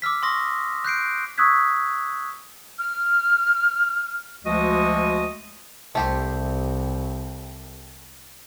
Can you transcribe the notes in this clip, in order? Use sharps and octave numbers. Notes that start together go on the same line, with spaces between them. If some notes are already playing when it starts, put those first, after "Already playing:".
D6 E6 F6 B6
C6 C#6 D#6 A#6
F#6 G6 C7 D7
C#6 D#6 E6 F#6 G#6 B6
F6
D2 F3 G#3 F#4 D#5 D#6
C2 A3 G4 C5